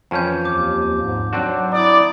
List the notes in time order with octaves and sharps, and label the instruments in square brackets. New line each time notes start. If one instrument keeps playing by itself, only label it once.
[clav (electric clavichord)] F2 C#4 [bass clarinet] E3 [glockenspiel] A5 G6
[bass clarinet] D#2 [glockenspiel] D6
[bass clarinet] G#2
[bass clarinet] F#3 [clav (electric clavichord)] C4 D4 F#4
[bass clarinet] E4 [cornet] D5 [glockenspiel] A#5 D#6